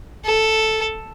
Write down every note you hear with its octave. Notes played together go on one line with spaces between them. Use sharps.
A4